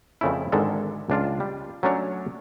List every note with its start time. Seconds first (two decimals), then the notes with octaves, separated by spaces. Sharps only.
0.21 F2 A#2 C#3 A3 E4
0.52 G#1 D3 D#3 G#3 A4
1.10 C#2 D4 F4
1.40 G3
1.83 F#3 A3 C#4 D4 C#5